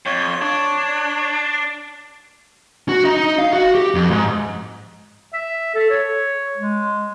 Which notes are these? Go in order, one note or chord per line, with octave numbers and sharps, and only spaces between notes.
F2 C#5
D4
F#4
D#4
F5
F#4
G4
F2
G#2
E5
A4
C#5
G#3